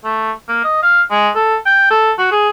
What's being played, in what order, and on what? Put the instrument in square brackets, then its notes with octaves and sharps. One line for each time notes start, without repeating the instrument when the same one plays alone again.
[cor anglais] A3
A#3
D#5
F5
G#3
A4
G5
A4
F#4
G#4